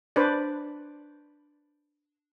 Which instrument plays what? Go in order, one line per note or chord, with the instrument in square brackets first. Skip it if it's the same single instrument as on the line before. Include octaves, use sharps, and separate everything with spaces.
[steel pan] D4 B4 C5 D5